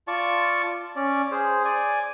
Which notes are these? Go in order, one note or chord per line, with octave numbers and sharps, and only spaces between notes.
F4 D5 A5 C#6
C#4 D5
G#4 C5
D5 G#5